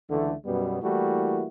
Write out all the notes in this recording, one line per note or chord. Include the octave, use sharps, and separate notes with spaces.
C#2 D3 E3 A3
F#2 B2 G3 B3
E3 G3 A3 A#3 E4 F#4